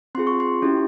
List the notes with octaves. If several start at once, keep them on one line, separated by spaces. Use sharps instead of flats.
C4 F4 G#4 C6
C#6
C6
C#4 E4 G4